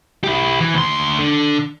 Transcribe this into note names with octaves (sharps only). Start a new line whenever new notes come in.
E4 G4
E3
D2 C6
D3